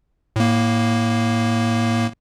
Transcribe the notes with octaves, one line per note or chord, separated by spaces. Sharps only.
A2 A#3